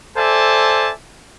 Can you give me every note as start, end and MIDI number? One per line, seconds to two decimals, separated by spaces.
0.17 0.92 69
0.17 0.92 72
0.17 0.92 74
0.17 0.92 76
0.17 0.92 80
0.17 0.92 81